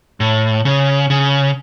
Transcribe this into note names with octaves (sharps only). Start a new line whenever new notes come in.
A2
C#3
C#3